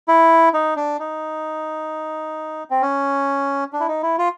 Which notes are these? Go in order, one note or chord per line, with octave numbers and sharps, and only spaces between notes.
E4
D#4
D4
D#4
C4
C#4
D4
E4
D#4
E4
F4